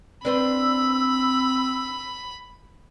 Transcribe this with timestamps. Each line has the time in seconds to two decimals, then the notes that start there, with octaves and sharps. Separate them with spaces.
0.25 C4 D4 B4 C5 B5 E6